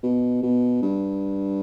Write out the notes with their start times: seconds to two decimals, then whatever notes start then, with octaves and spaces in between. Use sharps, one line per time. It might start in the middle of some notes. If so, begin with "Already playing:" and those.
0.03 B2
0.43 B2
0.82 G2